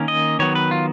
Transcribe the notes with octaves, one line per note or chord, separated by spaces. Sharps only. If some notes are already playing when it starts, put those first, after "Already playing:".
Already playing: D#3 A#3 C#4
D#5
D#3 F#3 B3 C#5
B4
F4